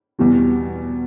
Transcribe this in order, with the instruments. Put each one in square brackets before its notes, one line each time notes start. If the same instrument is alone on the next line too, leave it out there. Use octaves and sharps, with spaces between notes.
[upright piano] E2 B2 G3